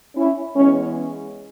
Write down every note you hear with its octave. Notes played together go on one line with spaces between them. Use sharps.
C#4 E4
E3 G#3 B3 C#4